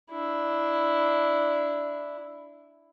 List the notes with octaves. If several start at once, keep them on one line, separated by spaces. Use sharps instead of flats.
D4 E4